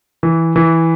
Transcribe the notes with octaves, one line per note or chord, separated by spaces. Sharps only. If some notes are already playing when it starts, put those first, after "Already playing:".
E3
E3